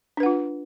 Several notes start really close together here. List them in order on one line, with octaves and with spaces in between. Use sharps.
D4 B4 F#5 F4